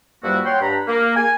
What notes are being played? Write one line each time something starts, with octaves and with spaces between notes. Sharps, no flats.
G2 F3 G3 A#3 E4 F#4
C#5 F#5 G5 C6
G2 D4 A#5 B5
A#3
G#5